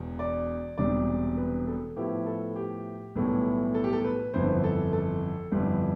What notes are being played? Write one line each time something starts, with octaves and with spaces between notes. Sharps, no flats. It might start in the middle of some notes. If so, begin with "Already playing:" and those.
Already playing: E1 E2 B2
D5
E1 E2 C3 G3 D4 D5
B4
A4
A2 F3 B3 E4 G4
A4
G4
B1 A2 E3 G3 B3
A4
G4
A4
B4
G1 F2 E3 C5
A4
A4
G1 F2 E3 G3